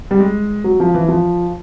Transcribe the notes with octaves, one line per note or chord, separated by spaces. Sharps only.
G3
G#3
F#3
F3
E3
F3